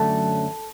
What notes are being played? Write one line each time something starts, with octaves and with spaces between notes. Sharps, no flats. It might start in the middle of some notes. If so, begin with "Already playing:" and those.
Already playing: F#2 D3 F#3 A3 A4